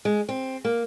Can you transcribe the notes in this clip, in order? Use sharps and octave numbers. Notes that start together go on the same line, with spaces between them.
G#3
C4
A#3